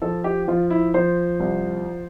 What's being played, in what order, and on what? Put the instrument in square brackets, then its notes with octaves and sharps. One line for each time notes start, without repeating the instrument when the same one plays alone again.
[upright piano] F3 A4
G4
F3 F4
E4
F3 C5
C2